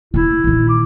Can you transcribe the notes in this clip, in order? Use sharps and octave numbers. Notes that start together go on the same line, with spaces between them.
C3 A#3 E4
A#2 D#3
D6